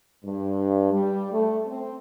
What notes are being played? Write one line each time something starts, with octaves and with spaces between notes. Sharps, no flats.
G2
G3
A3
C4